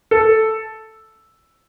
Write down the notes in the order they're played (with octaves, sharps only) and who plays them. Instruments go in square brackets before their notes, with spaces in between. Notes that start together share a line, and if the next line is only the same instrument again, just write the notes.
[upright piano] A4